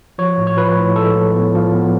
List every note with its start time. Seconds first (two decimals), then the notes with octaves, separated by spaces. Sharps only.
0.18 F3 C#5
0.38 A2
0.47 C#5
0.57 F3 B4
0.77 A2
0.96 G#3 A4
1.15 A2
1.34 B3
1.55 F3
1.74 B3